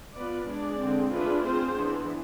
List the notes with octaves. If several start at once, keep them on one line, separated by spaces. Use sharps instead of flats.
B3 F4 B4 D5
G#3 D4 G#4 D5
D3 G#3 C4
A3 D4 F4 G#4 B4
C4 F4 G#4 C5
E3 B3 D4